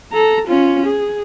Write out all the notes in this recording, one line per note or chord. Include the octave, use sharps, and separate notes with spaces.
A4 A#5
C#4 F4
G#4